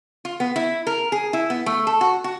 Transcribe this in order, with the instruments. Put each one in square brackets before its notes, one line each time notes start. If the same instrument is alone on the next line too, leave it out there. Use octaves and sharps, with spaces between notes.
[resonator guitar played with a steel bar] F4
B3
E4
A#4
G#4
E4
B3
A3
A4
F#4
F#4